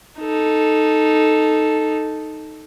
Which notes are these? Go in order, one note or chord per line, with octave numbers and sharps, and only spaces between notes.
D#4 A4